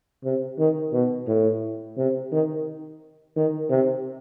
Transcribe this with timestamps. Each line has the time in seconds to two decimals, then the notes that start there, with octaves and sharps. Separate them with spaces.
0.24 C3
0.58 D#3
0.93 B2
1.28 A2
1.98 C3
2.32 D#3
3.36 D#3
3.70 C3